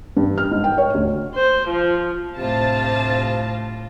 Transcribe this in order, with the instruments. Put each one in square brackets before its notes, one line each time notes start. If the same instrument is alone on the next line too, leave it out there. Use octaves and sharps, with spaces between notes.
[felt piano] G2
F6
G#2
G5
C#5
D2
[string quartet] C5
F3
[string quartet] D2 A2 F4 [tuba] C3 [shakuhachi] C5 [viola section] F5 A5